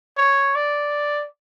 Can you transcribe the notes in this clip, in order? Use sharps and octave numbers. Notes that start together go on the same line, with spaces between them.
C#5
D5